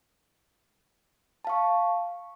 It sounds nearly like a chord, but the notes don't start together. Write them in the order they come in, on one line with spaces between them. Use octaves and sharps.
A5 F5 C#6